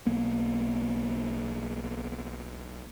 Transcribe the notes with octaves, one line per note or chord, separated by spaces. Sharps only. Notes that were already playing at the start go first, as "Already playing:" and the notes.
B1 A#3 B3